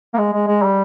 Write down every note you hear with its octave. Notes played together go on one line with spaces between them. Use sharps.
A#3
G#3
G#3
G#3
G3